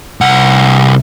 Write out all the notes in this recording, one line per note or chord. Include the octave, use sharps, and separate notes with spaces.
C2 F#5